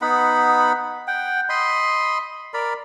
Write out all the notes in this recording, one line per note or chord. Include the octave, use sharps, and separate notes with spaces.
B3 D#4 F#5 B5
F#5 G5
D#5 B5 C6
A#4 D5 B5